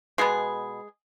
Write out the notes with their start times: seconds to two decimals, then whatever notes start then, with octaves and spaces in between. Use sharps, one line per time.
0.18 B2 G#3 B3 G#4